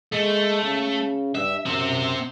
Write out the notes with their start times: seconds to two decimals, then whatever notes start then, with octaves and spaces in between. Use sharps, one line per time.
0.13 G#3 A3
0.63 C#3
1.35 G2 E5
1.66 F#2 C4 E5